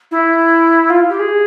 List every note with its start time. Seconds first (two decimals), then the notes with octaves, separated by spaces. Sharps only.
0.11 E4
0.90 F4
1.10 G4
1.19 G#4